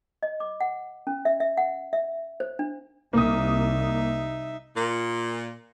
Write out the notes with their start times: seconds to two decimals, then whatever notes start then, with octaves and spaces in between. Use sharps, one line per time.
0.23 D#5
0.40 D6
0.61 F#5
1.07 C#4
1.25 E5
1.40 E5
1.57 F#5
1.93 E5
2.40 C5
2.59 D4
3.13 C2 A#3 D#4 E5 D#6
4.75 A#2